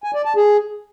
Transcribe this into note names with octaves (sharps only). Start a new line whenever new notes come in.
G#5
D5
A5
G#4